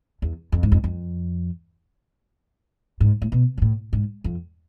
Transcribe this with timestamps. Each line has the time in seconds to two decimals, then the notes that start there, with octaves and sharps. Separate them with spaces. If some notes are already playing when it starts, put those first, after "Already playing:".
0.22 E2
0.52 F2
0.63 G#2
0.72 F2
0.84 F2
3.01 G#2
3.22 A2
3.32 B2
3.58 B2
3.62 A2
3.93 G#2
4.24 F2